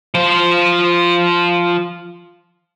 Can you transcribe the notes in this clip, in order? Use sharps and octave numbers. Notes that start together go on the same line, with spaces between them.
F3 C5